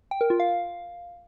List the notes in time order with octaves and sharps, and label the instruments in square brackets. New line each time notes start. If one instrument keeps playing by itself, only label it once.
[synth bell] G5
A#4
F4
F5